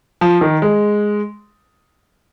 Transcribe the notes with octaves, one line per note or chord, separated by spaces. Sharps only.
F3
D#3
G#3